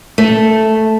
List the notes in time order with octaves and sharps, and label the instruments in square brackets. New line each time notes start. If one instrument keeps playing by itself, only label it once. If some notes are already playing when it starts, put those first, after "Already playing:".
[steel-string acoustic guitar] A3